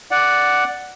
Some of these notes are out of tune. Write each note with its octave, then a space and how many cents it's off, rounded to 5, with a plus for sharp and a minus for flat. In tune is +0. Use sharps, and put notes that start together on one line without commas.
D5 +0 F#5 +0